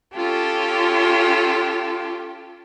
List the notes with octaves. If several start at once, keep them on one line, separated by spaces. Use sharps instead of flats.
C#4 F4 G4 A4